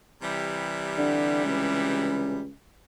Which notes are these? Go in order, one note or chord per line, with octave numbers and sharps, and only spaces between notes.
C3 E3 G3
D3
C#2